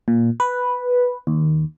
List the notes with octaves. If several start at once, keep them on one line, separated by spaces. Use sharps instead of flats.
A#2
B4
D#2